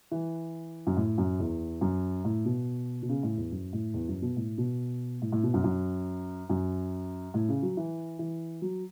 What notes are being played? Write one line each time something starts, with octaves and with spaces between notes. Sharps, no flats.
E3
F#2
A2
F#2
E2
F#2
A2
B2
B2
C#3
A2
E2
F#2
A2
E2
F#2
B2
A2
B2
A2
A2
B2
F#2
F#2
F#2
A2
C#3
F#3
E3
E3
F#3